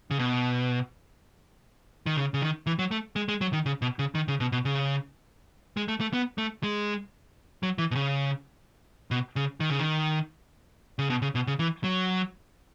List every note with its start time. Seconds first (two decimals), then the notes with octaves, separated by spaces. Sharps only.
0.11 C#3
0.19 B2
2.06 D#3
2.17 C#3
2.34 C#3
2.42 D#3
2.67 E3
2.79 F#3
2.91 A3
3.16 G#3
3.28 G#3
3.41 F#3
3.53 D#3
3.66 C#3
3.82 B2
3.99 C#3
4.15 D#3
4.28 C#3
4.40 B2
4.52 B2
4.65 C#3
5.77 G#3
5.88 A3
6.01 A3
6.13 B3
6.38 A3
6.63 G#3
7.63 F#3
7.78 E3
7.91 B2
7.95 C#3
9.11 B2
9.36 C#3
9.60 D#3
9.70 C#3
9.80 D#3
10.99 C#3
11.10 B2
11.22 C#3
11.35 B2
11.47 C#3
11.59 E3
11.84 F#3